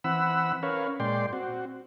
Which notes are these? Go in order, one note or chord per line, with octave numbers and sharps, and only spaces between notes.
E3 C4 F#5 B5 E6
C#4 A#4 B4 C#5 F5
A#2 G#3 D5 G5 C6
C4 F#4